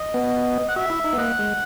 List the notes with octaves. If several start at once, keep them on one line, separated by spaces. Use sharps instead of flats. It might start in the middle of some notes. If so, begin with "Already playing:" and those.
Already playing: D#5
B3
F#5
F#4 E5
E4
D#4
B3
A#3 D#5 F#5
G#3